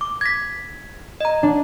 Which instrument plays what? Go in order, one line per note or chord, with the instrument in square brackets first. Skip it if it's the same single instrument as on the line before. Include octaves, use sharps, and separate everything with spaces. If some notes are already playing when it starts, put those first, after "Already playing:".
[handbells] D6
G#6 A#6 B6
D#5 A#5
[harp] D4